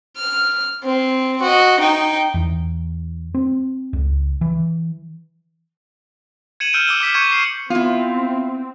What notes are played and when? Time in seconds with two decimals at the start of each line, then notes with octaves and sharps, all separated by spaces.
0.19 F6
0.85 C4
1.43 F#4 D#5
1.81 D#4 G5
2.34 E2
3.35 C4
3.93 C#2
4.41 E3
6.60 G#6 C#7 D#7 E7 F#7
6.73 E6 F6 G6 C#7 D7 E7
6.88 D6 E6 G7
7.01 D6 E6 F6 B6 C#7 E7
7.14 C#6 G6 G#6 C#7 D#7
7.32 C7
7.70 B3 C4 E4 F4